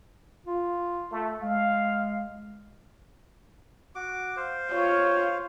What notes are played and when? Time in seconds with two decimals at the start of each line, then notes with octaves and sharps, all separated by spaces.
0.46 F4
1.11 A3
1.42 G#3 F5
3.95 F#4 D6
4.36 C5 F5
4.71 F4 C#5